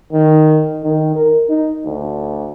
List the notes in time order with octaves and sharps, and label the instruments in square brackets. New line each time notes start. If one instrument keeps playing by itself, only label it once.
[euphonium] D#3
D#3
A#4
D#4
D2